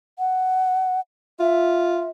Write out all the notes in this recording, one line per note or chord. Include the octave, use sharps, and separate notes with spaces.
F#5
F4 E5